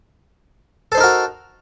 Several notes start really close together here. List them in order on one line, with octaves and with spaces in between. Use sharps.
A4 C5 D#4 A#4 F#4